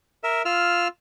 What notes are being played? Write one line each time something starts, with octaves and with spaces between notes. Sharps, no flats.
A#4 E5
F4 E6 F6